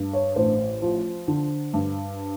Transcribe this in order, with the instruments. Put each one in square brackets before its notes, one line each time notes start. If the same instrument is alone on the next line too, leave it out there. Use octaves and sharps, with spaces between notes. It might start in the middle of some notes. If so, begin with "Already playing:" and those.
Already playing: [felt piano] G2
[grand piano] C#5
[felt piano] A1 [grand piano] C5
[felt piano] F3
D3
G2